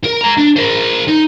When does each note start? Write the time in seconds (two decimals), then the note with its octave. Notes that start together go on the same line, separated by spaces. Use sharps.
0.04 A#4
0.21 G#3 A#5
0.37 D4
0.56 A#4 C5
1.08 D#4